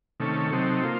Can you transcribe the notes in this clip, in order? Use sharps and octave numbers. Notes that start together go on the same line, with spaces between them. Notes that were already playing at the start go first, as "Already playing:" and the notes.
C3 D#3 A3 C#4 A4
C3 F#3 C4 D#4 A4
A#3 F4 C5